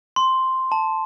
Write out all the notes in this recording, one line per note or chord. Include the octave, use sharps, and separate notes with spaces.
C6
A5